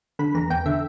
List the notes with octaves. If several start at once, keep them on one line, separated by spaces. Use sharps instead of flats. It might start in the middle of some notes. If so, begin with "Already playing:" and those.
D3 B5
E2 A#5
E2 G5
D3 E5